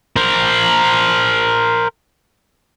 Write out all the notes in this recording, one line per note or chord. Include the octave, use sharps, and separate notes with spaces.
A#4 C5